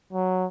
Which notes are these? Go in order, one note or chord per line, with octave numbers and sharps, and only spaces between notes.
F#3